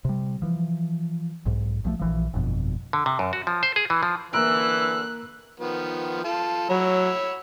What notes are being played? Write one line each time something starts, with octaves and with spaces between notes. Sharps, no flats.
C3 G3
E3 F3
B1 G#2
B1 F3 F#3 A3
A#1 E3 F3
G1 F2 B2
D3
C3
F#2
F#4
F3
C5
G#4
E3
F3
D3 E3 A#3 A#5 E6 F#6 D7
D#3 F3 B3
F4 A4 A5
F#3 C#5 B5 E6